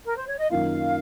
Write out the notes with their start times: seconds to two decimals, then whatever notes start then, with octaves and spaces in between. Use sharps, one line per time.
0.05 A#4
0.16 C5
0.27 C#5
0.38 D#5
0.50 F#2 D#3 A#3 F4 F5